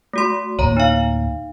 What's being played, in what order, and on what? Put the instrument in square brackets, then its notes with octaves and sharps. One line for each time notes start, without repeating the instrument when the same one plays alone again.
[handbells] A3 F#4 C6
[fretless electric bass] D2 A2 A#3 [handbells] C#5 A#5
[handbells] D#4 F5